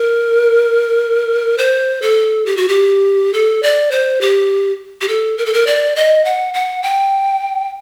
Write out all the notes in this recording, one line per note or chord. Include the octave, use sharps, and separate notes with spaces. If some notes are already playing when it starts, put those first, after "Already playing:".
Already playing: A#4
C5
A4
G4
F#4
G4
A4
D5
C5
G4
G4
A4
A#4
A4
A#4
D5
D#5
F#5
F#5
G5